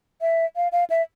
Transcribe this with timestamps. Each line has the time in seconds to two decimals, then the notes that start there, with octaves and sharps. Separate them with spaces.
0.21 E5
0.56 F5
0.72 F5
0.90 E5